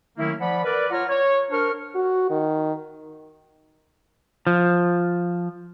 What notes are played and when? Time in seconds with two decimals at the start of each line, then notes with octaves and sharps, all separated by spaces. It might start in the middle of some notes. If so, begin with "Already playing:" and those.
0.18 D#3 F#3 A3 A#3 C#4 E4
0.41 F3 D5 F#5 B5
0.64 A#4 B4 D5
0.91 F4 C#5 F#5 A#5 F6
1.09 C#5
1.51 D4 A#4 C5 C#6 F6
1.95 F#4
2.30 D#3
4.47 F3